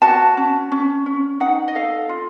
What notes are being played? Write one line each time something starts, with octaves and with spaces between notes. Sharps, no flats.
F#4 A5
C#4
C#4
C#4
D#4 F#5
D#5
A4 F5
F4